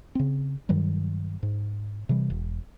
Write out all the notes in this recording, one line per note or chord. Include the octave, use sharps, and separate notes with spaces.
C#3 C4
G2 D#3 F#3 G3
G#2
C3 E3 G3
E1